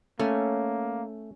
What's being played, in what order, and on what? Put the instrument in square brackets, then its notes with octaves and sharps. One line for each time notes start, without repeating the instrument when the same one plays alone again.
[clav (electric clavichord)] A3 [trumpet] A#3 [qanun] C#4